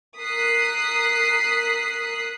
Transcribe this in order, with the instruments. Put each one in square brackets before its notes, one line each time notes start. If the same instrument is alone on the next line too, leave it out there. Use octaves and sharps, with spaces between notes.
[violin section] A#4 D#6 F#6 B6 C7